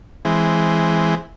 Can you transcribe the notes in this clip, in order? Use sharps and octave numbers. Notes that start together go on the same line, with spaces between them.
E3 G#3 C4